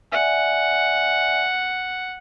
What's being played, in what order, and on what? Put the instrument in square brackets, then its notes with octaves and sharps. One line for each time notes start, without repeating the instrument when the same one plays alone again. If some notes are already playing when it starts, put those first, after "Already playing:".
[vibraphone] D5 E5 G#5 [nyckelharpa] F#5